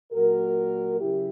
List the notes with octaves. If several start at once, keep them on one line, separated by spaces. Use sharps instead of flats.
A#2 F#3 F#4 A#4
C#3 F#3 E4 G4